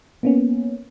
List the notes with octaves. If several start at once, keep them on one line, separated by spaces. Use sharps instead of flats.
A#3 B3 C#4